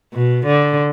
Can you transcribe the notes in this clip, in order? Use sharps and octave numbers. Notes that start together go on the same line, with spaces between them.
B2
D3